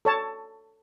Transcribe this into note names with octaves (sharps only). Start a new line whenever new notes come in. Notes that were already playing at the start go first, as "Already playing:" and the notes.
A4 C#5 A5